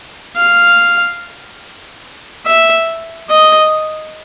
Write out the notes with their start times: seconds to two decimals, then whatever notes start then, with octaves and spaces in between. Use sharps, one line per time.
0.36 F5
2.46 E5
3.30 D#5